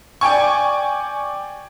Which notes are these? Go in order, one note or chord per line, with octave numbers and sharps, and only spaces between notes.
D5 G5 G#5 C#6